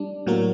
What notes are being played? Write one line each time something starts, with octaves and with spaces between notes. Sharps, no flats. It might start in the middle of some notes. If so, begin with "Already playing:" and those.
Already playing: G3 D4
A2 F#3 A#3 F#4 A#4